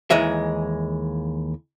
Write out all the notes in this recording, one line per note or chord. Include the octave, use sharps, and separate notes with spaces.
D#2 E3 G#3 E5